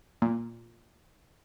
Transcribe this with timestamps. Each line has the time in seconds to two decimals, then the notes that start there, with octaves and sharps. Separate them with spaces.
0.22 A#2